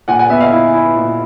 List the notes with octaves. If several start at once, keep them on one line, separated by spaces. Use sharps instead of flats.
A#2 F#5 G#5
F#5 G#5
B3 E5 F#5
D#5 F5
E4
E4
A#2